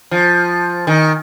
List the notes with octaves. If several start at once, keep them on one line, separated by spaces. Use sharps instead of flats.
F3
D#3